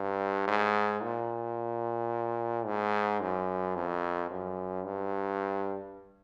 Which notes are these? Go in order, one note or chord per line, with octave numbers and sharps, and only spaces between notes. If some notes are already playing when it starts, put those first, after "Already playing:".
Already playing: G2
G#2
A#2
G#2
F#2
F2
F#2
G2